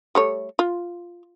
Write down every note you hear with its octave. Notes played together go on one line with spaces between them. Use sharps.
G3 A3 C#5
F4